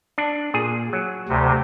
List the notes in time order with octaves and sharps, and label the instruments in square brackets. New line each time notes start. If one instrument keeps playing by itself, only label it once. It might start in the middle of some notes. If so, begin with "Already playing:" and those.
[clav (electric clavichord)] D4
A#2 G#4
F#3
[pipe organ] D2 C3